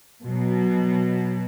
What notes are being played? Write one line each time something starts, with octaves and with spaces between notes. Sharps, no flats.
B2 F#3